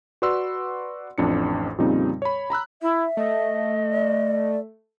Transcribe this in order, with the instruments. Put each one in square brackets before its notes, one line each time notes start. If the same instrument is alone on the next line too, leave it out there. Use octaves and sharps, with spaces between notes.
[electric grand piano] F#4 B4 D5 F#5 C6 E6
A1 F2 D4 C#7
F2 A#2 C#3 G3 C4 D#4
C#5 B5
A#5 B5 E6 F#6
[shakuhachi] E4 [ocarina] E5
[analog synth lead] A3 [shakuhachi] D#5
[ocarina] D5